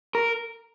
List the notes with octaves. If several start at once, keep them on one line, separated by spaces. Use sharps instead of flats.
A#4